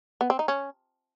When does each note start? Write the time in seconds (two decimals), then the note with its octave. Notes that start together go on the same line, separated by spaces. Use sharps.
0.21 B3
0.30 C4
0.39 D#4
0.48 C#4